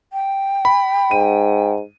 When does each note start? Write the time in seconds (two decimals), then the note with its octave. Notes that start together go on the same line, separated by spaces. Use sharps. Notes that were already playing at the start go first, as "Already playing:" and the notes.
0.13 G5
0.65 B5
1.11 G#2 D#7